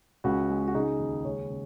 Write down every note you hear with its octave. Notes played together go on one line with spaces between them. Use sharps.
C#2 C#4 F#4
G#3
F#4
C#3 D#4 G#4
D#2
C#2 G#4 C#5
C#3